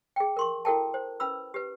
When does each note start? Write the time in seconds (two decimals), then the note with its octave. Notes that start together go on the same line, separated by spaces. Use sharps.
0.16 G#4 G5
0.37 A#4 C6 C#6
0.65 E4 F#4 A4 A#4 G5 A5
0.94 C5
1.20 C#4 B4 B5 E6
1.54 G4 B4